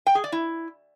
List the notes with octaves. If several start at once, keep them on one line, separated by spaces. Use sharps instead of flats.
G5
G#4
D5
E4